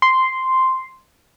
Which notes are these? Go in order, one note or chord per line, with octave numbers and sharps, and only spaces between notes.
C6